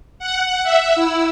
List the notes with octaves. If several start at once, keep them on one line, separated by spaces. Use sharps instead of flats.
F#5
E5
E4